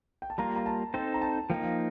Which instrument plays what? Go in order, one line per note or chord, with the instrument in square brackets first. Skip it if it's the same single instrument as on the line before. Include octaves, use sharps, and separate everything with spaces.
[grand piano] G5
A5
[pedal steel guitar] G3 A#3 F4 [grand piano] A#5
[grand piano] A#5
A5
[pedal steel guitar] C4 D#4 A4 C5 [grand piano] G5
[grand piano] A#5
A5
[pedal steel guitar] F3 A#3 D#4 [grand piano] G5
[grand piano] F5